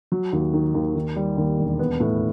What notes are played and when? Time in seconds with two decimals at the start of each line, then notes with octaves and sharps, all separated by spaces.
0.12 F#3
0.33 D#2
0.53 D#3
0.75 D#2
0.96 D#3
1.16 G3
1.37 D#2
1.58 E1
1.79 B3
2.00 A2